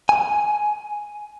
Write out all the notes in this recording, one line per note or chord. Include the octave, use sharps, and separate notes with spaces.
G#5